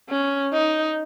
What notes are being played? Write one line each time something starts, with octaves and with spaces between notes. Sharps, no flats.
C#4
D#4